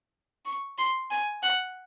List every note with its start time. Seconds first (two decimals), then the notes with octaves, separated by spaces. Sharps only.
0.45 C#6
0.78 C6
1.10 G#5
1.43 F#5